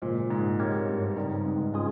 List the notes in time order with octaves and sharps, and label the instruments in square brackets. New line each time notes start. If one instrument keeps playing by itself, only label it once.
[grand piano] A#2 [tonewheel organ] C#3 F3 G#3
[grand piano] G#2
[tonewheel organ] G#3 C4 G4 A#4 C#5
[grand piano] G2
[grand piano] G2 [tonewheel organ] C#3 G3 C4 D#4
[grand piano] G#2
G2
[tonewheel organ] G#3 C#4 F4 G#4